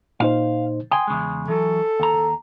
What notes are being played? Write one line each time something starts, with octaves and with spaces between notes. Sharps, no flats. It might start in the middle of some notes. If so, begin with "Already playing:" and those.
A#2 D#4 C5 F5
G5 G#5 C6 D#6
E2 C#3 G#3
E3 F#3 A4
D#2 A#5